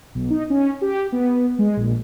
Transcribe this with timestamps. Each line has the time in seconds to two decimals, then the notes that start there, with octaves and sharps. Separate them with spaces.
0.15 B1
0.30 D#4
0.50 C#4
0.82 G4
1.12 B3
1.59 G#3
1.77 A#1